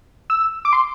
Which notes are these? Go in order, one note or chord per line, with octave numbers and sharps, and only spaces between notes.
E6
D6
C6